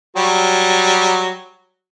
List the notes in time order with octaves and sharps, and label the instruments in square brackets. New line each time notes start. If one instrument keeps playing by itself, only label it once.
[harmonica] F#3 G3